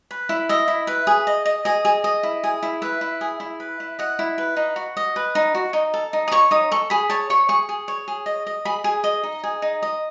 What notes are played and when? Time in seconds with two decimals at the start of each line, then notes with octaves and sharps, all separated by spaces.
0.11 B4
0.29 E4
0.49 D#5 E5
0.68 E4
0.87 B4
1.07 G#4
1.27 D#5
1.45 D#5
1.65 G#4 D#5
1.85 G#4
2.04 D#5
2.23 E4
2.44 G#4
2.63 E4
2.82 B4 E5
3.01 E4
3.21 G#4
3.40 E4
3.60 B4
3.80 E4
3.99 D#5 F#5
4.19 E4
4.38 B4
4.57 D#4
4.76 F#4
4.97 D#5
5.16 B4
5.35 D#4
5.55 F#4
5.73 D#4
5.94 A4
6.13 D#4
6.28 D#6
6.32 C#5 C#6
6.51 D#4 D#6
6.72 A4 C#6
6.90 G#4 B5
7.10 C#5 A5
7.30 C#5 C#6
7.49 G#4 C#6
7.69 G#4
7.88 C#5
8.08 G#4
8.26 D#5
8.47 D#5
8.65 G#4 B5
8.84 G#4
9.04 D#5
9.23 D#4
9.43 G#4
9.62 D#4
9.83 D#5